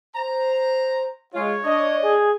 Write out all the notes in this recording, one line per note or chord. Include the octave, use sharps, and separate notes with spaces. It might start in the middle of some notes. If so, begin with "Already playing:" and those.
C5 A#5
G#3 F4 C#5
D4 D#5
G#4